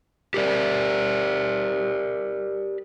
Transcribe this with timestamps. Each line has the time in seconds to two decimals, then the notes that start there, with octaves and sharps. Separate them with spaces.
0.34 G4 A#4 D5